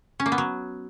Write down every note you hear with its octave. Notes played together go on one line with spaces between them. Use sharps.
C#4
A#3
B3
F#3